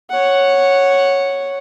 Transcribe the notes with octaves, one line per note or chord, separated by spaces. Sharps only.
C#5 F#5